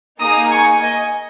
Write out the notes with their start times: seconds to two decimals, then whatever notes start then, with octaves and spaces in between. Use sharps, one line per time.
0.19 A#3 D#4 G#4 A#5 D#6
0.51 G#5 C#6
0.81 D#5 G#5